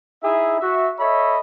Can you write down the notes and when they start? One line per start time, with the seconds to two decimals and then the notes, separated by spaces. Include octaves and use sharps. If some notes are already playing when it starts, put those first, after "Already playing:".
0.23 D#4 E4 G#4 E5
0.60 F#4 E5
0.99 A4 C#5 D#5 E5 B5